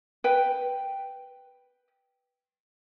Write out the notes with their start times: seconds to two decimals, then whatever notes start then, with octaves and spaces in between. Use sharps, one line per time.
0.24 B4 G5